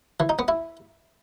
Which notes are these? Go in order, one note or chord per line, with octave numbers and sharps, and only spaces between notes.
E3
D#4
B3
E4